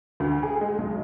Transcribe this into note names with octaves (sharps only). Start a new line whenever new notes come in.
D2
G#4
G#3
B1